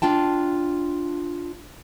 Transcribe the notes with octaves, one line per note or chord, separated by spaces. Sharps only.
D4 F4 G5 A5